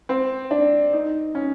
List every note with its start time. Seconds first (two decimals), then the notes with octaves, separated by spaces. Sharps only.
0.09 C4
0.51 D4
0.93 D#4
1.35 C#4